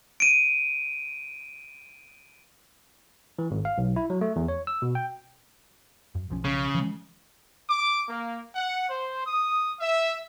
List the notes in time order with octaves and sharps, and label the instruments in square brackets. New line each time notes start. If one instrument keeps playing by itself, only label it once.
[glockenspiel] D7 D#7
[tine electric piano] E3
G#1
F5
B1
E4
F#3
A3
E2
C#5
E6
B2
G5
[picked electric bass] F#2
B1 F3 C#4
[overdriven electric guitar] C#3
[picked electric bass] E3 F3 G#3
[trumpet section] D6
A#3
F#5
C5
D#6
E5